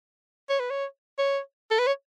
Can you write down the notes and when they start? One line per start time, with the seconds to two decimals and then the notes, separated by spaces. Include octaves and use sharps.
0.49 C#5
0.60 B4
0.70 C#5
1.18 C#5
1.71 A4
1.79 B4
1.87 C#5